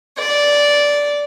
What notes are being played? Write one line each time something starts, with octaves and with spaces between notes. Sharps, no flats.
D5